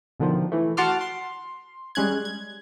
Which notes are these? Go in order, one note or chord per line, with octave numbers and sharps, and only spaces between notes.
B2 D3 D#3 F3
E3 A3
F#4 F#5 A5 C6 D6 F6
C6
G3 G#3 C#4 F#6 G#6
G#6